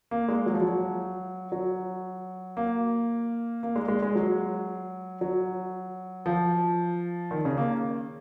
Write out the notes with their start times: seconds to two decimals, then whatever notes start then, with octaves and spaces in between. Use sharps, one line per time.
0.11 A#3
0.28 G#3
0.46 F#3
0.54 F3
0.61 F#3
1.52 F#3
2.57 A#3
3.63 A#3
3.76 G#3
3.88 G#3
4.02 G#3
4.15 F#3
5.21 F#3
6.26 F3
7.31 D#3
7.45 C#3
7.57 A#3